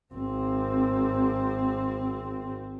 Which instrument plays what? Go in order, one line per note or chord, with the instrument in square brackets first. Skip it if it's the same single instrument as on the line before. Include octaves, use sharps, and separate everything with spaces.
[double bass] G#1 C4